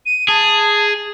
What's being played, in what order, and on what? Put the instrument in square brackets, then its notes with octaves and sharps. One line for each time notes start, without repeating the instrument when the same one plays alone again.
[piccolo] D#7
[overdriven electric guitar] G#4 [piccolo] A5